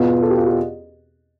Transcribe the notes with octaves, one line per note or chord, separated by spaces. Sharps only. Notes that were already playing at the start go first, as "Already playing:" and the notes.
Already playing: E2 B2 B3 F4
A4
G4
F4
G4